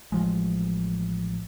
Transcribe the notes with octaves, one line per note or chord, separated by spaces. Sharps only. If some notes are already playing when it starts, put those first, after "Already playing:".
A1 F3 G#3